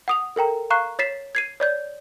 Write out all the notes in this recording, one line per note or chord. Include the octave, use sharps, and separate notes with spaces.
F#5 D#6 F7
A4 A#4 G5 A#5
F5 A#5 C#6 F#6 C7
C#5 A6 B6 C7 E7
G#6 C7 D#7
C#5 D5 G6